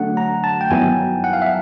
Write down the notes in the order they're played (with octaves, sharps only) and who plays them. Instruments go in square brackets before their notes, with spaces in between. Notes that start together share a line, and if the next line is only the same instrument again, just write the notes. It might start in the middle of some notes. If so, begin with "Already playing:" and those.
Already playing: [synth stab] D3 F#3 A3 D4 [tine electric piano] F#5
[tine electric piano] A#5
A5
G5
[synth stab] G2 D#3 F#3 B3 E4 [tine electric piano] G#5
[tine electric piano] F#5
F5
E5